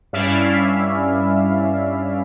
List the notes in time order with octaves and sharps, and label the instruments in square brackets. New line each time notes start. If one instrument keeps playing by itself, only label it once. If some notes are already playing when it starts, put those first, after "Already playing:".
[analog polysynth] G2 C#4 E4 D5 E5 F5